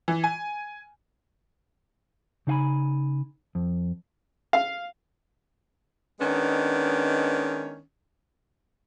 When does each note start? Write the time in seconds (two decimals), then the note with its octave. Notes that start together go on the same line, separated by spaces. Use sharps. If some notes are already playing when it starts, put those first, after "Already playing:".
0.08 E3
0.24 G#5
2.47 C#3 D#4 F5 G#5 B5
3.55 F2
4.53 F5
6.20 D#3 G#3 B3 C#4 D4